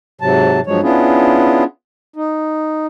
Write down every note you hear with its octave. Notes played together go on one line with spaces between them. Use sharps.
G#2 C3 F#3 A5
G2 F3 F#3 G#3 C#5
B3 C#4 D4 E4 F4 G#4
D#4